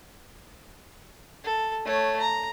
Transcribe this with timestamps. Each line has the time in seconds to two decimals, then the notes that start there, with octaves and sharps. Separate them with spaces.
1.44 A4
1.85 A3 C#5
2.20 A#5